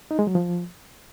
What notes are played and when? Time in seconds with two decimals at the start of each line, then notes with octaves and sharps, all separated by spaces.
0.11 D#4
0.19 G#3
0.27 F#3
0.35 F3